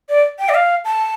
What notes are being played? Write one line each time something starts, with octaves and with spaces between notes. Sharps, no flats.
D5
G5
D5
F5
A5